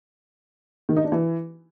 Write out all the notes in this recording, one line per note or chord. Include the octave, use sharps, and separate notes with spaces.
D#3
D#4
D4
E3